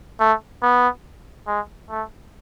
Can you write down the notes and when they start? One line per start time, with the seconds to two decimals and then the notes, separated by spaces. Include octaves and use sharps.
0.20 A3
0.63 B3
1.47 G#3
1.90 A3